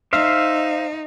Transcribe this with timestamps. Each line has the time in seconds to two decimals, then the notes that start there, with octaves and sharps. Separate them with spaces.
0.13 D#4 C5 E5 F5